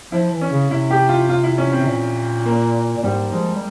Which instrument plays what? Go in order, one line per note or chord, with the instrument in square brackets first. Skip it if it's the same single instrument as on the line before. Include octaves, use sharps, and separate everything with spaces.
[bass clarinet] F3 [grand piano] E4
[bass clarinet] E3
[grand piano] C#4
[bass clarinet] C#3
[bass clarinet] C3 [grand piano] E4
[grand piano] G4
F4
F4
E4
C#4
C4
[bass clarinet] C3
A#2
[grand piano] A#3
[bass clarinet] A#2
[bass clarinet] G#2 [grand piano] G3
[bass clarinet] F3 [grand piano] G#3
[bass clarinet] G3